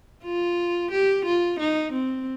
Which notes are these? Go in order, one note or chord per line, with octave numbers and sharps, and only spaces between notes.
F4
G4
F4
D#4
C4